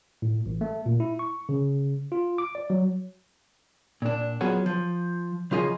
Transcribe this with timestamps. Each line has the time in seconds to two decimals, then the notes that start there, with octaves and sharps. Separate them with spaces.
0.22 A2
0.46 A1
0.61 A3
0.86 A#2
1.00 E4
1.19 C#6
1.49 C#3
2.12 F4
2.38 D6
2.55 D5
2.70 F#3
4.02 A#2 D4
4.41 F#3 B3 F4 F#4 G#4 C#5
4.66 F3
5.51 C#3 F3 F4 G#4 D#5 G#5